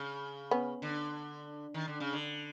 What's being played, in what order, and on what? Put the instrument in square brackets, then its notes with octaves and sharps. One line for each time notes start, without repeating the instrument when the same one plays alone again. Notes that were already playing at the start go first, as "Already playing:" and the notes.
Already playing: [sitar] C#3
[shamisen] B3 C#4
[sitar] D3
D#3
D3
C#3
D3